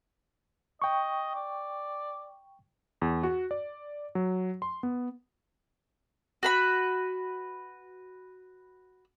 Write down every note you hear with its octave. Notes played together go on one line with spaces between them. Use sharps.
D#5 G5 C#6
D5
E2
F#4
D5
F#3
C6
B3
F#4 B4 B5